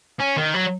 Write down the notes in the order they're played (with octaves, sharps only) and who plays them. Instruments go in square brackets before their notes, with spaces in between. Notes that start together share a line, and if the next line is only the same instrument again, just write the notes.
[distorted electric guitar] C#4
D#3
F#3